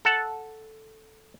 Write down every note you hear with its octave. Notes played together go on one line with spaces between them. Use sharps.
A4 F#5 A5